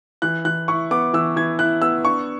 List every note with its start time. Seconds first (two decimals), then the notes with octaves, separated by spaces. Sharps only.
0.22 E3 F#6
0.45 E3 F#6
0.68 E4 C#6
0.91 B3 D6
1.13 E3 E6
1.36 E3 G#6
1.59 E4 F#6
1.82 B3 E6
2.05 D4 C#6